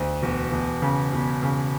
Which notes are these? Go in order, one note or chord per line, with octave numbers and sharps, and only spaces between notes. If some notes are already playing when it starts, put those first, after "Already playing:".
Already playing: D2
E1
E1
C#3
E1
C#3